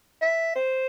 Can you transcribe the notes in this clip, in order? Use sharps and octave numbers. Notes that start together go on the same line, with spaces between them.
E5
C5